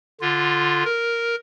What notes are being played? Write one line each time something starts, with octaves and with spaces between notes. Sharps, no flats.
D3 F4
A#4